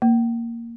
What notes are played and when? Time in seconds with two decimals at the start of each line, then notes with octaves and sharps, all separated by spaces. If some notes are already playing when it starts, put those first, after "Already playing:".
0.02 A#3